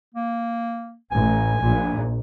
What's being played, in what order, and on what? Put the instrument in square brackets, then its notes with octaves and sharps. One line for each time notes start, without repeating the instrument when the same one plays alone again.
[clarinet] A#3
[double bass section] A1 [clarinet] G#5
[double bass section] A#1 A#2